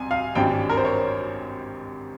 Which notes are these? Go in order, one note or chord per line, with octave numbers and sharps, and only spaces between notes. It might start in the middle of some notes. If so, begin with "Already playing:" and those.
Already playing: C2 G#5 C6
F5
G#1 G2 G3 C#4 G5
A#4
C5
C#5